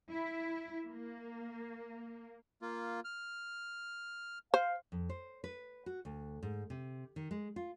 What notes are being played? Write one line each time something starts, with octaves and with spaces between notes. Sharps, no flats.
E4
A#3
A#3 F4
F6
C5 F5
F2
C5
B4
F#4
D2
G#2
C3
D#3
G#3
F4